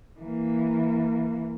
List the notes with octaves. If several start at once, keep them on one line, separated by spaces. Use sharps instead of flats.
E3 A#3